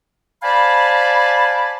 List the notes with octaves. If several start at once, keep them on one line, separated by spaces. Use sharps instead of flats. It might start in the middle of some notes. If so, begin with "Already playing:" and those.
C5 D5 F5 G#5 A5 B5